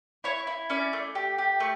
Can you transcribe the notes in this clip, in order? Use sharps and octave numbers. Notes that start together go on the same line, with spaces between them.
E4 C#5
E4
C#4 D5
A3
G4
G4
A3